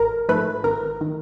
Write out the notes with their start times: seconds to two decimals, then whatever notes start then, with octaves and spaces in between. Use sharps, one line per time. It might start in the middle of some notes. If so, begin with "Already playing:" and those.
Already playing: A1 A#4
0.29 G#2 F3 A3 B4
0.64 G#1 A#4
1.01 D#3